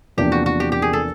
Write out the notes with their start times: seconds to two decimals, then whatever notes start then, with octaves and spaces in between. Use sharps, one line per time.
0.17 E2 C3 F3 A#3 D4 G4
0.32 F#4
0.46 F#4
0.60 G4
0.72 G4
0.82 G#4
0.93 A4